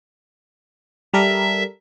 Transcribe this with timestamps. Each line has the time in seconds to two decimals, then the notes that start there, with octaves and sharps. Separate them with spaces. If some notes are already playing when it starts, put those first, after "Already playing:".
1.14 G3 A4 A#4 E5